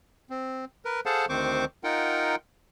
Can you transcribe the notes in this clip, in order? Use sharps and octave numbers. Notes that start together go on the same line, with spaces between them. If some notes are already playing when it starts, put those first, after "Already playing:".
C4
A#4 B4
G#4 A4 C5 F5 F#5 A5
D2 D#3 C4 C5 C#6 D6
D#4 F4 A#4 F#5 G5